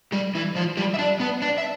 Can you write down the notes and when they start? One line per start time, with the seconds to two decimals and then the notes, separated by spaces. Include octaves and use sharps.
0.12 G3 G4
0.35 E3 E4
0.55 F3 F4
0.77 G3 G4
0.94 E5
0.99 D4 D5
1.20 B3 B4
1.42 D4 D5
1.58 E5